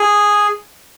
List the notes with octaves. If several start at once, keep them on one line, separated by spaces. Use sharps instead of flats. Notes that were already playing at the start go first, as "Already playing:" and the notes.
Already playing: G#4